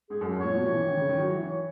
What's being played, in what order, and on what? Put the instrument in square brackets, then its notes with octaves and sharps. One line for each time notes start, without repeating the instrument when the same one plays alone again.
[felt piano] G#2 [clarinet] G#4
[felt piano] F#2
G#2
[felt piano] A#2 [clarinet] C#5
[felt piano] B2
E3
E3
D#3
C#3
D#3
F#3
E3
[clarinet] C#5